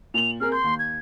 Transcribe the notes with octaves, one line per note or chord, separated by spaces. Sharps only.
A#2 F7 F#7
C4 G#4 A#4 F6
C6 G6
D#2
G#6